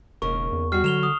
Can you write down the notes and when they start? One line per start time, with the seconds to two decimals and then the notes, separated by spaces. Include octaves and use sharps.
0.22 E1 D#2 C#3 A#4 C#6
0.53 E2
0.72 G3 F#4 F6 C7
0.84 D3 F#3 E7 F7 G7
1.03 D#6